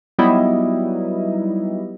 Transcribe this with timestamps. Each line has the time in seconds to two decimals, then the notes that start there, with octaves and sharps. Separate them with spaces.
0.19 F#3 G3 B3 D#4 E4 D#5